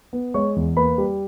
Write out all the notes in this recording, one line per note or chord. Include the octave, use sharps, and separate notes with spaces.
B3
G#3 C#5 C#6
E2
A#3 B4 B5
G3